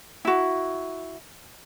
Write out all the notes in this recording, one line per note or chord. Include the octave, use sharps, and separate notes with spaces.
E4 F#4